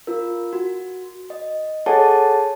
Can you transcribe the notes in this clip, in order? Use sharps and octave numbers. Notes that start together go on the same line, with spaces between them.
F4 A#4
F#4
D#5
G#4 A4 C#5 F#5 G#5 A5